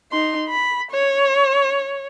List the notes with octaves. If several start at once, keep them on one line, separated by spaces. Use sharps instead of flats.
D#4 C6
B5
C#5